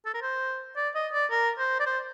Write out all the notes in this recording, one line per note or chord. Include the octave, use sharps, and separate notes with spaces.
A4
A#4
C5
D5
D#5
D5
A#4
C5
D5
C5